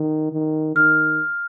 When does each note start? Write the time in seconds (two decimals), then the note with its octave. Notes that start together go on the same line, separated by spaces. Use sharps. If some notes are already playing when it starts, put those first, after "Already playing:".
Already playing: D#3
0.32 D#3
0.75 D#3 F6